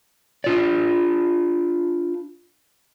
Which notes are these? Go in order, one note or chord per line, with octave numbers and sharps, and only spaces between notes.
D4 F4 D5